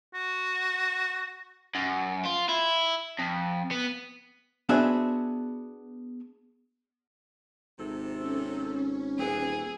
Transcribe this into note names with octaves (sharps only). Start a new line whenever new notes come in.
F#4
F#2
F4
E4
F2
B3
B3 D4 F#4 G#4 C5 E5
G#1 C3 A4
C#4
D#1 E3 B3 C4 G#4